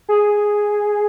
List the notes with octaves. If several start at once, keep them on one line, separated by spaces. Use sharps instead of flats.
G#4